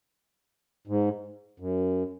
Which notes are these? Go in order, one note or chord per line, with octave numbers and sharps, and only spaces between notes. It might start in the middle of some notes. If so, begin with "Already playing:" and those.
G#2
F#2